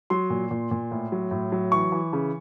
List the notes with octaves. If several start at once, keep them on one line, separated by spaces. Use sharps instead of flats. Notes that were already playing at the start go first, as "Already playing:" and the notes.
F#3 C6
A#2
A#2
A#2
A2
F#3
A2
F#3
E3 C#6
E3
C#3